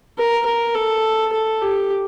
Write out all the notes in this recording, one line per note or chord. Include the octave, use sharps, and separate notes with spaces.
A#4
A#4
A4
A4
G4